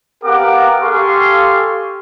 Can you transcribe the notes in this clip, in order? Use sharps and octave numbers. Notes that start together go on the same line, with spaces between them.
B3 G4 A#4 F5 F#5 D6
G4 A4 F5 G#5 C6 C#6